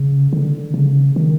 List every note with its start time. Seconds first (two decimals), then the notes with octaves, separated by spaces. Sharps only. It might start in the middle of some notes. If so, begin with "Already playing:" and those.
Already playing: C#3
0.33 D3
0.74 C#3
1.16 D#3